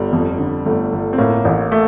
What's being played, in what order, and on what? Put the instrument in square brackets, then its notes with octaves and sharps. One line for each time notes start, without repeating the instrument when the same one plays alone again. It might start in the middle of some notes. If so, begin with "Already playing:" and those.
Already playing: [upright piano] G1 [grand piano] G3
[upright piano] F2
D3
[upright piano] G1 [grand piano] A3
[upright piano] G1
[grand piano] C4
[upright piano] A2 [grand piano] A#3
[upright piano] A1
A3